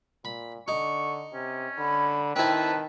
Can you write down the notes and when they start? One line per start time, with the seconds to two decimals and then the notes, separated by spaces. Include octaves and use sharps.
0.25 A#2 B5
0.68 D3 D#4 C#6
1.33 C3 C#4
1.78 D3 B5
2.36 D#3 C4 E4 B4 A5